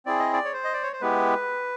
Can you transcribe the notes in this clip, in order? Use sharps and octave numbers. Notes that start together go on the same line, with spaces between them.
C4 E4 G#4 D5
D#5
D5
C#5
C5
D#5
D5
C#5
C5
G#3 B3 E4 G4 B4